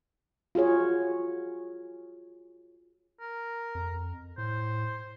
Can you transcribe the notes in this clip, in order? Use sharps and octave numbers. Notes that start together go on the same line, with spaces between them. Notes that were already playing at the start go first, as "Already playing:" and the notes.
F4 F#4 G#4 C#5
A#4
F2
A2 C5